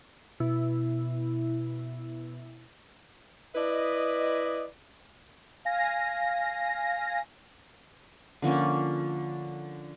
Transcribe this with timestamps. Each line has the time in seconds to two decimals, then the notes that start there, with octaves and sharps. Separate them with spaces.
0.40 B2 E4
3.55 E4 B4 D5 D#5
5.65 F5 G#5 A#6
8.42 D3 F3 A#3 C#4